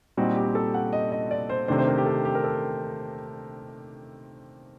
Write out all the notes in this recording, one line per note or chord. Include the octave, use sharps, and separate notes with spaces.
A#2 G3 C4 D#4 F#4
G4
A4
F#5
D#5
D#5
D5
C5
C3 D#3 A3 D4 C5
C5
A#4
G4
A4
G4
A#4
A4